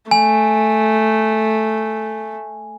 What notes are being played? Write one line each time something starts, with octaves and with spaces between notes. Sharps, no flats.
A3 G#5